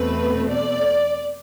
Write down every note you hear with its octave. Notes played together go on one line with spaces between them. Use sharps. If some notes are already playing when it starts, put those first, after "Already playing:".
Already playing: E2 B2 A3 C4 B4
D5